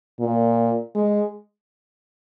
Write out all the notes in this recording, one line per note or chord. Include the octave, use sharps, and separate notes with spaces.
A#2
G#3